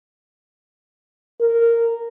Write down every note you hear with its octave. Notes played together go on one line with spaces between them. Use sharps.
A#4